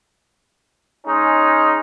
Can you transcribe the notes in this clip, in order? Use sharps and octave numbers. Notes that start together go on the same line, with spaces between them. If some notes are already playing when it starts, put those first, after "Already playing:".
G#3 C#4 D#4